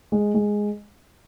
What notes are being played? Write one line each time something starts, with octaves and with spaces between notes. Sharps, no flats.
G#3
G#3